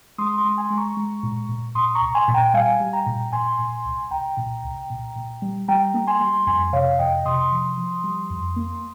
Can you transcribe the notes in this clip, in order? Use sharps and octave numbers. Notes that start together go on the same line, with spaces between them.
G#3 C6 D#6
C6 D#6
G#3
G#5 C6
G#3
A#5 C#6
G#3
A#2
A#2
A#2 C6 D#6
A#5 C#6
C2
G#5 C6
A#2
G5 A#5
G5
G3 F5 G#5
G3
G5 A#5
A#2
A#2 G#5 C6
A#2
C2
C2 G5 A#5
A#2
C2
A#2
A#2
G3
G3 G5 A#5
A#3
G#5 C6
G3
F2 G#5 C6
C3 C#5 F5
F2 D#5 G5
C3 C6 D#6
F3
F3
G3
F2
A#3